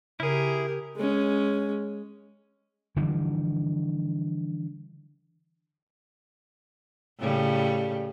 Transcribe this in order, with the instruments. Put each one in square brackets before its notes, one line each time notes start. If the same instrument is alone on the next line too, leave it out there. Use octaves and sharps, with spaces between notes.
[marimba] C#3 [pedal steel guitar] E4 G#4 [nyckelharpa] G4 A#4
[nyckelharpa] G#3 C#4
[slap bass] D3 E3 F3 G3
[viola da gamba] A2 C#3 G3